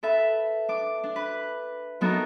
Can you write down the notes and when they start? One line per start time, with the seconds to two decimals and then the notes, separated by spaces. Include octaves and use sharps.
0.03 A4 B4 E5
0.69 D4 D6
1.03 D4
1.16 B4
2.01 F#3 B3 D#4 F#4 A4 A#4